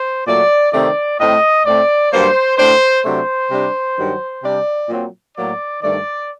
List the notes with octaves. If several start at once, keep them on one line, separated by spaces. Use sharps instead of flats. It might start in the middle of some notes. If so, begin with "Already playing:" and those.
Already playing: C5
A#2 F#3 A3 D5
C3 D#3 A3 C4 D5
A2 A3 C4 D#5
A2 A3 C4 D5
G2 F#3 A#3 C5
A2 A3 D4 C5
C3 F#3 A3 D4 C5
C3 G3 D4
G2 D#3 F#3
C3 G3 D4 D5
A#2 F#3 C4
A2 F#3 A#3 D5
G2 D#3 A3 D5